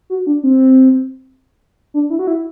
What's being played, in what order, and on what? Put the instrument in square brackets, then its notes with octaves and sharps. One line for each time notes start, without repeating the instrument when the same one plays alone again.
[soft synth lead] F#4
D4
C4
D4
E4
F#4
E4